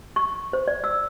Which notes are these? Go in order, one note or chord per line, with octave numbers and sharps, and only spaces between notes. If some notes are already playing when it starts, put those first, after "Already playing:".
C#6
C5
D5
E6